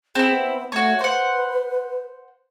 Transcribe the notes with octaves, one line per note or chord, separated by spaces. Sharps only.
C4 E4 G#4
B3
A3 F#4 C#5
B4 C5 F#5